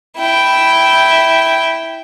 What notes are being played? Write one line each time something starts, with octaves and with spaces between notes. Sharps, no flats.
E4 G5